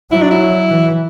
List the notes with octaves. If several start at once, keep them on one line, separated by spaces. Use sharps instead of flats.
F#3 E4
D4
E4
E3